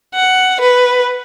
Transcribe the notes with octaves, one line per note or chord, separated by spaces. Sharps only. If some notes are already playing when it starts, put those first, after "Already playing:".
F#5
B4